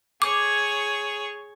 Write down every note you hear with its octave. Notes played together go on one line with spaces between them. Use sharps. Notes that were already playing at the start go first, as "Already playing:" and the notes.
G#4 C#5 D6